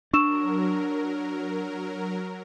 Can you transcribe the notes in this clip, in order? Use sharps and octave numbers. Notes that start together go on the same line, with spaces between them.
F#3 D4 A#4 C#6 E6 E7